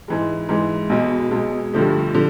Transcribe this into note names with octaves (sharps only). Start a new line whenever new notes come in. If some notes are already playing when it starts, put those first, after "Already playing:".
G#2 E3 G#3
G#2 E3 G#3
B1 B2 G#3
B1 B2 G#3
G2 D3 F3 A3
D3 F3